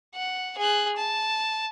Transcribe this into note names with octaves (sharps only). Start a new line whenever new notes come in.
F#5
G#4 F#6
A5